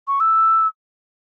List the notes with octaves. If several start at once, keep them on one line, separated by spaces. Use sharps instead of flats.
C#6
E6